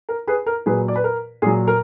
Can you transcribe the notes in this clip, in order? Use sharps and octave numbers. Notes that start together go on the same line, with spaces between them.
A#4
G#4 B4
A#4
A#2 F#3 G#4 B4
D5
B4
A#4
A#2 F#3 G#4
A#4